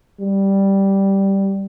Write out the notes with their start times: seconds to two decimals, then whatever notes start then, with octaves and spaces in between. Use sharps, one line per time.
0.21 G3